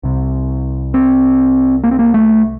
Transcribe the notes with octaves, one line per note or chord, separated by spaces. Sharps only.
C2 C3
C4
A#3
C4
A#3
A3